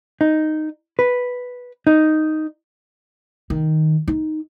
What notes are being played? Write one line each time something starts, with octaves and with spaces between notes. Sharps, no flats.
D#4
B4
D#4
D#3
D#4